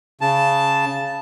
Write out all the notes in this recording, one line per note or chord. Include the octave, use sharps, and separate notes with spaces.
C#3 A5